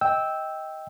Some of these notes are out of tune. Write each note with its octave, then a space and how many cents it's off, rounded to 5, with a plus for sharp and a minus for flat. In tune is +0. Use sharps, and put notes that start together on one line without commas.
D#5 +20 G5 +0 E6 -10